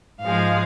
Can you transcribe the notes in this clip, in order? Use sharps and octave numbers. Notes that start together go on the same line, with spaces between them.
G#2 F3 G#3 F5